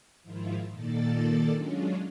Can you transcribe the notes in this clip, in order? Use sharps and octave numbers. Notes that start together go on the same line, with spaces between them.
G#2 D#3 F3 E4 F4
A#2 D#3 A#3 A4 D5 A6
F#3 G#3 C#4 D4 F4